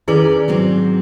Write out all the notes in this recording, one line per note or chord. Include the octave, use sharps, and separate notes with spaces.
D#3 C#4 E4 G#4 B4 D5
G#2 F#3 C4